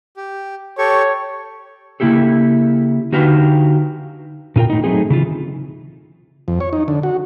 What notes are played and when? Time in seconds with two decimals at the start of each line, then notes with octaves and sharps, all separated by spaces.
0.17 G4
0.78 G4 A4 C#5 C#6
2.00 C#3 A#3 E4 G4 A4
3.12 D3 D#4 F#4 G4 B4 F5
4.56 A#2 D#4 F4 A#4 G5
4.70 A2 D#4
4.84 F#3 A3 C4 D#4 G#4
5.10 C#3 E3 F4
6.48 F2
6.60 C#5
6.73 D#4
6.88 D3
7.03 F#4